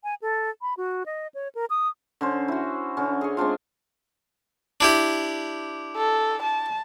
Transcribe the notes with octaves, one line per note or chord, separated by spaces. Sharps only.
G#5
A4
B5
F#4
D#5
C#5
A#4
D#6
D3 C#4 C5
E4 F#4
D3 C#4
G#4 C#6
G#3 C4 D4 F4
D4 E4 G4
A4
A5